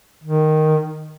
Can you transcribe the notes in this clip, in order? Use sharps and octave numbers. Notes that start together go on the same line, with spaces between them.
D#3